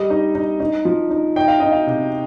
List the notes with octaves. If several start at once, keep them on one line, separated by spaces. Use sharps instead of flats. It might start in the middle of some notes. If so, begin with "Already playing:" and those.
Already playing: G3 D#5
D#4
D#4
D#4
F3
D#4
D#4 G5
F5
D#4 D#5
F5
C3